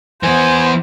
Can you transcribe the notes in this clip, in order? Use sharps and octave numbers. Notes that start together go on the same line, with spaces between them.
E3 B3 C5 G#5